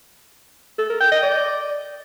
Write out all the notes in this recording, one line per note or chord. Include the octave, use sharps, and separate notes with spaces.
A4
A#4
G5
D#5
D5